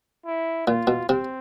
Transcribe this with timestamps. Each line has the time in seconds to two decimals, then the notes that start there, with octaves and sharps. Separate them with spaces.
0.26 E4
0.67 A#2 F4
0.87 B2
1.09 C3 C4